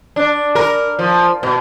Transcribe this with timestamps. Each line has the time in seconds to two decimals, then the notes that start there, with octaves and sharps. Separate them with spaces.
0.16 D4
0.55 A#4
0.99 F3
1.43 B2